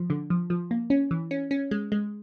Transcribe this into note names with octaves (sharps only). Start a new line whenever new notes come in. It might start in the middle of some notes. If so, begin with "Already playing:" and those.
Already playing: F3
D3
F3
F3
A#3
C#4
E3
C#4
C#4
G#3
G#3